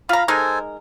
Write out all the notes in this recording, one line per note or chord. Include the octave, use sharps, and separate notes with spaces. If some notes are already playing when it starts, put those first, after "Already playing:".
F4 F5 A#5 B5
G#3 D#4 A4 A#4 C5 G#5